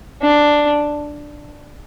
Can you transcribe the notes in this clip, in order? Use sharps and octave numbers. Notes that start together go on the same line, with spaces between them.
D4